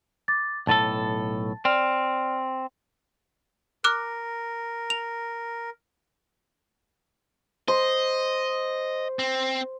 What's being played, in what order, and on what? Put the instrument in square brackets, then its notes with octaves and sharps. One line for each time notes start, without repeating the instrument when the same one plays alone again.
[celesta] D6 A6
[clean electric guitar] B1 A2 A4 [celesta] A5 A6
[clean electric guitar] C4 [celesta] D5 F6 F7
[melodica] A#4 [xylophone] D6 F6 F#6
[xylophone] F7
[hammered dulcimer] C5 [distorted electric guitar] D#5
[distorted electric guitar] C4